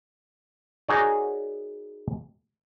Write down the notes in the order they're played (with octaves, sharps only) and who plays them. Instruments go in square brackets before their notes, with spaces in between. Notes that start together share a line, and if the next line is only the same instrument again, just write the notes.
[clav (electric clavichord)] D#4 F#4 G#4 A#4 C#5 D5